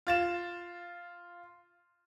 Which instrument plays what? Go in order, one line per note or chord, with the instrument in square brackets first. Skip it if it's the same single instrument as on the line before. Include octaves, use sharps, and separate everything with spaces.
[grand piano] F4 A6 E7